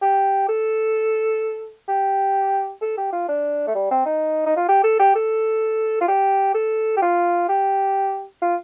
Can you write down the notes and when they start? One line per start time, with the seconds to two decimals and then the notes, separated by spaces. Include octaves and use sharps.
0.02 G4
0.49 A4
1.88 G4
2.82 A4
2.97 G4
3.13 F4
3.28 D4
3.67 A3
3.75 G3
3.91 C4
4.06 D#4
4.46 D#4
4.57 F4
4.68 G4
4.84 A4
4.99 G4
5.15 A4
6.01 F4
6.08 G4
6.54 A4
6.97 G4
7.02 F4
7.49 G4
8.42 F4